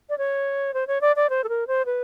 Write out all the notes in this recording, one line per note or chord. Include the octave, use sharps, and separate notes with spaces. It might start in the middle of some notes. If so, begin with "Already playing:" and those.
D5
C#5
C5
C#5
D5
D5
C5
A4
A#4
C5
B4